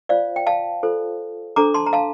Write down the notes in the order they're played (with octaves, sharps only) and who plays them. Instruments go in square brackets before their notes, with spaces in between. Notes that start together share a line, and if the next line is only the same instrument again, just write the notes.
[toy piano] F4 C5 D5 F5
G5
F5 A5
F4 A4 C5
D4 A4 C5 A#5 D6
A5 C6
A#5
F5 A5